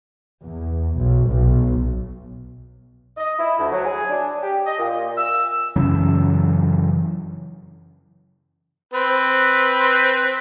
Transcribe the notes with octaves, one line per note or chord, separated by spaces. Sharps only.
E2
B1
B1
D#5
E4
D2
F#3
G#4
D4
G4
D#5
A#2
E6
F#2 C#3 E3 F#3
C4 B4